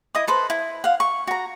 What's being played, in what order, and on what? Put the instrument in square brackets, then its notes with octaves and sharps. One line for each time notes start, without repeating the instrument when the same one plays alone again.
[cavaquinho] E4 D#5 D#6
A4 B4 C5
E4
F5 F#5
C#6
F#4 A#5